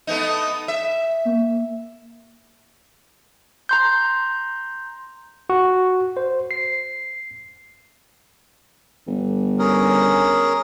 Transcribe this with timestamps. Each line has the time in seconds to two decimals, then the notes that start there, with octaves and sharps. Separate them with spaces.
0.07 A3 B3 D#4
0.68 E5
1.25 A#3
3.69 A#5 C6 G6
5.50 F#4
6.17 C5
6.51 C7
9.07 G1
9.59 C#4 G#4 A#4